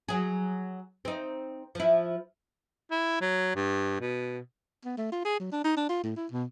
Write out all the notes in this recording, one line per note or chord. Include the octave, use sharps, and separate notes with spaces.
F#3 G#4
C4 D#4
F3 E4
E4
F#3
G2
B2
B3
A3
F4
G#4
F#3
D4
D#4
D4
F4
A2
E4
B2